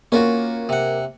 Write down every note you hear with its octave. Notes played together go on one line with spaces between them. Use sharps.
A#3 C#4 F4 F#4
C3 F#5